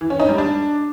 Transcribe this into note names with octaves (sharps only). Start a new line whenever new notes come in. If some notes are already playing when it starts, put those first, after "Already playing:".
E3
C#4
D#4
G3
D4